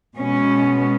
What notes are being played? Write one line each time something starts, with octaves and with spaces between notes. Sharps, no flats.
B2 G#3 B3 C#4